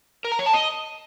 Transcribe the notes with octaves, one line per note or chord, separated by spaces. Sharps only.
A#4
A#5
C#5
A5
D#5